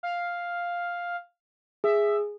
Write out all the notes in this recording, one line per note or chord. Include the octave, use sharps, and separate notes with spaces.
F5
G#4 E5